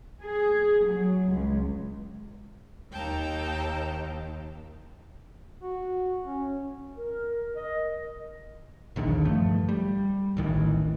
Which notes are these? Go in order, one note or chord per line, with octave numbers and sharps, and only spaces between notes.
G#4
F#3
C#2
D#2 G5 A5 A#5
F#4
C#4
A#4
D#5
A#1 D#2 D3 D#3
G2 F3 A3
G3
A1 D2 D#3 E3